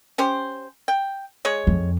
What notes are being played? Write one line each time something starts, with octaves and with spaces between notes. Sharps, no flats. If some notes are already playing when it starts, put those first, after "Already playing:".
C#4 G4 C5
G5
G#3 G#4 C#5
F2